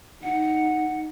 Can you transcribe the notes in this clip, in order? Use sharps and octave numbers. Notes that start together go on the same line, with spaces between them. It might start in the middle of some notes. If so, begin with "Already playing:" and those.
D#4 F#5